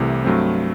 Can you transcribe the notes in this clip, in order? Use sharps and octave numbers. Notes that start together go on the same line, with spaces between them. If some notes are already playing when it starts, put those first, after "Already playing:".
Already playing: C2 C3 E3 A3
G2 F#3 A3 C4